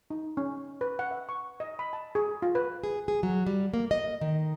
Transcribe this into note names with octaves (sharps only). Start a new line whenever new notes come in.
D#4
C#4
B4
F#5
E5
C#6
D#5
B5
A5
G#4
F4
B4
G#4
G#4
F#3
G3
A#3
D#5
D#3